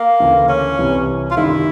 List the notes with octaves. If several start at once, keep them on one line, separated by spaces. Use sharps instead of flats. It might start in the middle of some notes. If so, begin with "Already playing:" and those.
Already playing: A#3
D2 C#3 E3 A3
C#4
C2 C3 E3 G3
F4
F#2 D#3 G3 E4